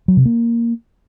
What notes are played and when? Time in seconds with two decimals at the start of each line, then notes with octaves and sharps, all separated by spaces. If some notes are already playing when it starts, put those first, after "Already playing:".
0.08 F#3
0.17 C3
0.25 A#3